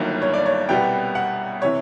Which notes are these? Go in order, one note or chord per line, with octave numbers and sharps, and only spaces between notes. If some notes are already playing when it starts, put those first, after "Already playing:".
Already playing: G1 G2 D#3 F#3 A#3
C#5
D5
C#5
C2 B2 G3 B3 G5
F#5
C3 E3 C#5